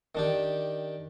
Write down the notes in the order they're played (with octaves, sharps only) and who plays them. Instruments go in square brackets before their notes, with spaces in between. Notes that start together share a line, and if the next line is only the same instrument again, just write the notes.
[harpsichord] D#3 D4 G4